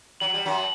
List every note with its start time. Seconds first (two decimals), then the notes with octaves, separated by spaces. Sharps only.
0.20 F#3 F#7
0.34 G3
0.45 F#2 F#3